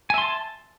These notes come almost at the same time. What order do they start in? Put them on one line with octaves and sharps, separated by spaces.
G#5 E5 C6 A5